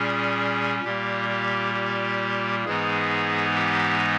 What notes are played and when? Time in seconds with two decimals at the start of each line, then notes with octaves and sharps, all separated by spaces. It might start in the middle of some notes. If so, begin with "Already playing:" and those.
Already playing: A#2 G3 C#4 G#4
0.83 A#2 G3 A#3 G4
1.29 G4
1.74 G4
2.65 G#2 E3 G#3 B3 D#4 G#4
3.55 G4